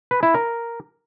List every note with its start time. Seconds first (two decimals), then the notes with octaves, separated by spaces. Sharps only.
0.11 B4
0.23 E4
0.34 A#4